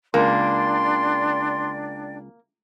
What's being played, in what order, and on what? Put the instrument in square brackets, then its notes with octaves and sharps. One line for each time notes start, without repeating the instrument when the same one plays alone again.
[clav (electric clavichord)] C#2 [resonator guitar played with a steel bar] A#3 [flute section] D4 D5 G5 [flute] C6